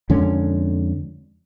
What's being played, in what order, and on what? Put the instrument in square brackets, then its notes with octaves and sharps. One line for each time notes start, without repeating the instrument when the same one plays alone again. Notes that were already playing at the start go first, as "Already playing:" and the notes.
[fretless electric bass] F2 D3 G#3 C#4